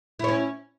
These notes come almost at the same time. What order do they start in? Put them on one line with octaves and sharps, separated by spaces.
E4 C#5 C#4